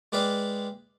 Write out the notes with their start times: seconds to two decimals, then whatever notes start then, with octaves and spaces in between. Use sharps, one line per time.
0.12 G#3 G4 B4 D5 E5 F5